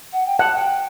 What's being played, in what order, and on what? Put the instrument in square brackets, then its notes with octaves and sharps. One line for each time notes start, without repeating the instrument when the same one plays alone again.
[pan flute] F#5
G5
[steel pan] F#5 [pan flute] A5
[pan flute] G5